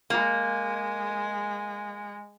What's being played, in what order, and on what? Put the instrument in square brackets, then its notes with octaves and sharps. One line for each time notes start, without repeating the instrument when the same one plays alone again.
[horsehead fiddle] G#3 [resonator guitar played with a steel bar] A#3